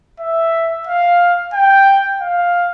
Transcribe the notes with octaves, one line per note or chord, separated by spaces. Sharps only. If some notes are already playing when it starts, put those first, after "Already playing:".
E5
F5
G5
F5